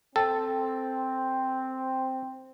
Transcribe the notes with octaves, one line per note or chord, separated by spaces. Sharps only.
C4 A4 G5 A5